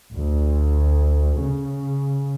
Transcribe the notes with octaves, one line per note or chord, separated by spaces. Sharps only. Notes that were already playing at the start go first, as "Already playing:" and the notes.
D2
C#3